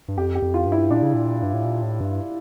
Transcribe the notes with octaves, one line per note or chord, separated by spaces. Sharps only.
G2
F2 G4
G4
F2
F4
G2
E4
A#2 D4
C#3
A#2
G2
A2
A#2
A2
G2